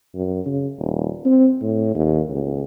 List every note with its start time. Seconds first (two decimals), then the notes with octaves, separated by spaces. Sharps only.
0.15 F#2
0.46 C#3
0.79 D#1
1.25 C4
1.62 A2
1.95 D#2
2.29 C#2